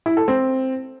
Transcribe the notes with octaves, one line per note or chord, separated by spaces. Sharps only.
E4
A4
C4